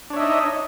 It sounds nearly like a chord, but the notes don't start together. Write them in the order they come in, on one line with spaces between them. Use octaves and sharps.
D4 C#5 E5 D#5 D#4